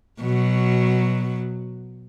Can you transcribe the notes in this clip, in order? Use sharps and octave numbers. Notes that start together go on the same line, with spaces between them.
B2 F#3